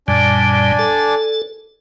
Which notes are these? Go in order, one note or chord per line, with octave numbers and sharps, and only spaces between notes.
F#2 A#2 G3 D4 D5 G#5
A4